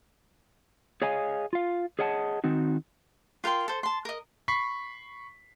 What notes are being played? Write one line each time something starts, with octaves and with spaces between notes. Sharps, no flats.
G#4 C#5 D#5 F5 G#5
F4 F5
G#4 C#5 D#5 F#5 A5
D#3 C4 D#4 F#4
F4 A#4 G5 C6
A4 C5
A5 C6
A#4 D#5
B5 C#6 B6 C7